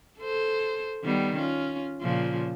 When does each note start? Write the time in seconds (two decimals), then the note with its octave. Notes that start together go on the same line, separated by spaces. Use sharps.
0.19 A4 C5
1.04 D#3 G3 B3
1.38 C#4 F4
2.01 A#2 C#3 F3